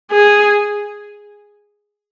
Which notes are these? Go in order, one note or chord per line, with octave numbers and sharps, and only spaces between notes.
G#4